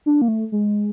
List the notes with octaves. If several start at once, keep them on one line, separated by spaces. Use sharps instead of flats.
D4
A#3
A3
G#3